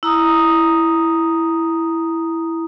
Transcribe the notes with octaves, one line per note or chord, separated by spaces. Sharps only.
E4 A#5 D#6